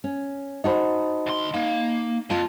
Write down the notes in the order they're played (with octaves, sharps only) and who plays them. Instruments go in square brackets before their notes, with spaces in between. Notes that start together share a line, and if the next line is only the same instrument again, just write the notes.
[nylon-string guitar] C#4
[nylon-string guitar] D#4 F#4 C5 [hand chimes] D#5 A5 B5
[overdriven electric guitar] D2 C6
[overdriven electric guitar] A#3 [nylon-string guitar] D#4
[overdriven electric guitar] F2 [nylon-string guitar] F4 A5